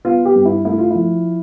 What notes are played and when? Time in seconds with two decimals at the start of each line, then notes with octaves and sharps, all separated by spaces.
0.05 B3 F4
0.25 G4
0.36 G2
0.45 E4
0.65 A3 E4
0.78 F4
0.91 F3 E4